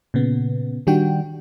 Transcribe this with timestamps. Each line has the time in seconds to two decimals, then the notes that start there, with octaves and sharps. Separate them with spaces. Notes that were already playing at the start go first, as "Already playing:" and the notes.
0.14 A#2 C#3 B3
0.87 D#3 G3 D4 F#4 G5